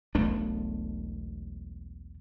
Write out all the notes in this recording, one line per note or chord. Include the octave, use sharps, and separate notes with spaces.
E1 B1 A3 D4